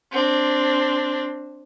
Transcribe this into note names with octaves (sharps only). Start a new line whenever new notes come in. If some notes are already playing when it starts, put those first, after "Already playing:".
C4 D4